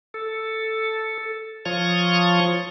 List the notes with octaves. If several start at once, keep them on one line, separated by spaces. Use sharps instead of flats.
A4
F3 F4 C#5 C#6 D#6